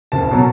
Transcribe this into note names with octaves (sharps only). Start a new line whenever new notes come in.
F#1 A5
B2 F#3